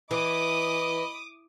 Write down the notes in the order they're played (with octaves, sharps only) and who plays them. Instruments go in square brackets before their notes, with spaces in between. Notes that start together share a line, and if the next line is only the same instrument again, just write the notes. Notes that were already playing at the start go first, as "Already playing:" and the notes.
[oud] E3 [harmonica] D#5 B5 [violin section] D6 D#6